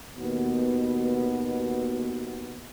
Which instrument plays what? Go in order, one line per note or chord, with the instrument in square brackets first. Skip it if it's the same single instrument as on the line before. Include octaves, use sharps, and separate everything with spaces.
[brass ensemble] D#2 B2 B3